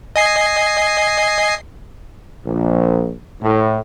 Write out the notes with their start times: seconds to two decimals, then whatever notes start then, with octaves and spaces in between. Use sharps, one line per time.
0.16 D#5 G#5 C7
2.46 A#1
3.42 A2